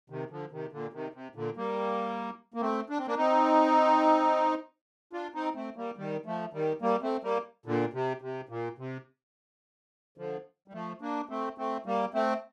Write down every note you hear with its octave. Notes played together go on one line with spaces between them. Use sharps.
C3 D#3
D3 F3
C3 D#3
A#2 D3
C3 D#3
C3
A#2 D3
G3 A#3
A#3
A3 C4
D4
C4
A#3 D4
C4 D#4
D4 F4
C4 D#4
A3 C4
G3 A#3
D#3 G3
F3 A3
D#3 G3
G3 A#3
A3 C4
G3 A#3
A#2 D3
C3
C3
A#2
C3
D3 F3
G3
F3 A3
A#3 D4
A3 C4
A3 C4
G3 A#3
A3 C4